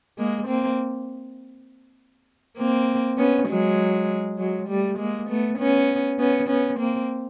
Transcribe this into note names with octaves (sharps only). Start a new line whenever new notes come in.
G#3 A#3
A#3 C4
A#3 C4
B3 C#4
F#3 G#3
F#3 G#3
G3 A3
G#3 A#3
A3 B3
B3 C#4
B3 C#4
B3 C#4
A#3 C4